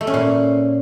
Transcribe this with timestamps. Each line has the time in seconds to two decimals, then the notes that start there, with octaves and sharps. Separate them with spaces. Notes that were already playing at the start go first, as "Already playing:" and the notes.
0.01 A3
0.07 C#4
0.14 A#2